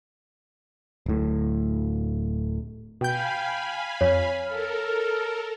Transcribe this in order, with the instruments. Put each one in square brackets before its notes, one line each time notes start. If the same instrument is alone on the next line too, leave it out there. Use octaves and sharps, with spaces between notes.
[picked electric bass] D1 A2
[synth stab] B2 G6 [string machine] F5 G#5 B5 [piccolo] G5
[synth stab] F2 [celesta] C#5 [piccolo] B6
[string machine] A4 A#4 [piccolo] F6